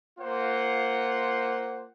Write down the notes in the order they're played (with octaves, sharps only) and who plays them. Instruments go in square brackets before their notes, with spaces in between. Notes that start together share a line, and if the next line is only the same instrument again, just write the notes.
[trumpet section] A#3 F4 C5 F#5